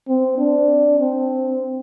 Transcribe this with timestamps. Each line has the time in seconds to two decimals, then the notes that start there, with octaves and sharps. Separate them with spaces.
0.08 C4
0.38 D4
1.00 C4